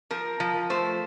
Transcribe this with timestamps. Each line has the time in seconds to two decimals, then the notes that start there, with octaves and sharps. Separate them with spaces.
0.11 F3 A#4
0.40 F3
0.70 A3 C5